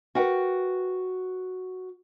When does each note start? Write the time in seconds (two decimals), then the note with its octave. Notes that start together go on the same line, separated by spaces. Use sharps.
0.15 F#4 A#4 B4 F#5 G5